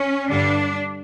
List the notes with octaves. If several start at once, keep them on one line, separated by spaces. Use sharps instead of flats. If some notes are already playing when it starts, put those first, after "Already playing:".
Already playing: C#4
G2 D3 G3 D4